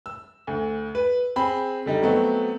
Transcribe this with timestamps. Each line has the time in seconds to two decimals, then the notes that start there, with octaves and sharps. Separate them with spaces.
0.06 E6
0.47 D2
0.95 B4
1.36 C4 G#4 B5
1.86 D3 G3 D#4
2.02 F#3 A3 B3 C4